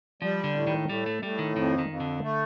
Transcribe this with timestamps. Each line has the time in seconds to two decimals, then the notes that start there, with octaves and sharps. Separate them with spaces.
0.22 F3 G3
0.44 D3
0.55 A2
0.67 D#3
0.89 A2 G3
1.06 A3
1.23 A2 G3
1.39 D#3
1.56 F2 D#3
1.79 D#3
1.89 F2
2.00 D3
2.23 A3